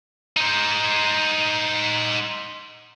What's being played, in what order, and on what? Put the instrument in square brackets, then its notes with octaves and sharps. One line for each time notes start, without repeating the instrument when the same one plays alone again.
[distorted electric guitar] D#4 C5